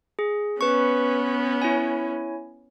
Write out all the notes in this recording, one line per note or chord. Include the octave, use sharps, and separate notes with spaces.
G#4
B3 C#4 B4 C#6
E4 C#5 G#5